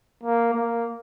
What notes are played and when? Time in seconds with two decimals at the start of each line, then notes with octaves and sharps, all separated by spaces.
0.24 A#3
0.54 A#3